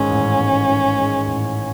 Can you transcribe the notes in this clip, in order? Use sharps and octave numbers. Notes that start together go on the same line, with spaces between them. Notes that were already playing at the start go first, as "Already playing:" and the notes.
Already playing: A1 G#2 D#3 G#3 C#4
A1
G#2
D#3
G#3
A1